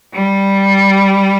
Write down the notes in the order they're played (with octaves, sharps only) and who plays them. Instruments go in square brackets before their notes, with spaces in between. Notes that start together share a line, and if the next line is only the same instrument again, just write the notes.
[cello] G3